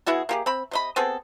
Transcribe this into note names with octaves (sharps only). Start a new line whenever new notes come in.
B3 E4 F#4 G#4
A#3 G4 G#4
C4 B5
C3 D#5 B5
B3 C4 G#4 A4